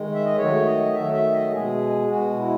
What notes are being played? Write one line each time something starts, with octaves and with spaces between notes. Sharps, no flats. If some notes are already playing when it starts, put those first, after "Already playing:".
Already playing: D#3 G#3
E5
D#5
D#3 F#3 A3 C#5
D#5
D#3 F#3 A3 E5
E5
D#5
B2 G#3 G#4
B2 G#3 F#4
E4